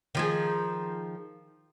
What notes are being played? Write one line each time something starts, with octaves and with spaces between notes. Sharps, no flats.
D#3 F3 G#4